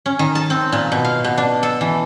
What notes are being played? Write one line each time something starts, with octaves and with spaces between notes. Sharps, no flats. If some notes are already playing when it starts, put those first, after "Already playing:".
C#4
D#3
A5
C4
A#2
B2
F5
B2
D4
A4
E3